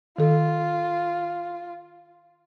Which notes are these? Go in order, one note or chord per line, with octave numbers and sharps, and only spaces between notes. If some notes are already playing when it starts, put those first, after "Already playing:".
D#3 F4 A4